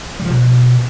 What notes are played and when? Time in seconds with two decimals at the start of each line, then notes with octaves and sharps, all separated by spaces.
0.20 G3
0.25 F3
0.30 B2